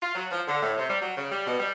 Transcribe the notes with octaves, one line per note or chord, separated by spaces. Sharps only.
F4
F#3
F3
D3
A2
C3
G3
F#3
C#3
G3
B2
G3